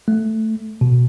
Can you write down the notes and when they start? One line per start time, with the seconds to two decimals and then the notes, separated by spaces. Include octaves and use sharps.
0.08 A3
0.81 B2